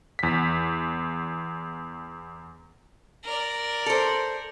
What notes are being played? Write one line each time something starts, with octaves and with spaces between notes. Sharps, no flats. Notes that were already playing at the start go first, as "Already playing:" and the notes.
E2 B6
A#4 D5
A4 C5